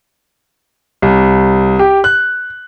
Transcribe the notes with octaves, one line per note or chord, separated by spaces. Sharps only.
C2
G4
F#6